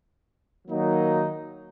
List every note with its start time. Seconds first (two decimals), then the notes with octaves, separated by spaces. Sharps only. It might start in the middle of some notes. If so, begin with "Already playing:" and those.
0.67 D#3 F#3 A#3 D#4 F#4